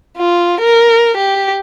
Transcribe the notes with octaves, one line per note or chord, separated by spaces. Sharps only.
F4
A#4
G4